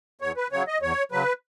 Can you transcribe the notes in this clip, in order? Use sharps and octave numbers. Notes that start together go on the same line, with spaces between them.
E2 C#5
B4
C#3 F#3 C#5
D#5
E2 C#5
C#3 F#3 B4